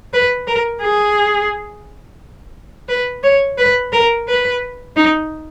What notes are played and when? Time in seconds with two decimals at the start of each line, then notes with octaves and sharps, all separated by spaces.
0.13 B4
0.47 A#4
0.82 G#4
2.89 B4
3.24 C#5
3.58 B4
3.93 A#4
4.28 B4
4.96 D#4